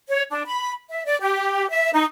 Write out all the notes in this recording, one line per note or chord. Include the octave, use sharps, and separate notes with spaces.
C#5
D4
B5
E5
D5
G4
E5
D#4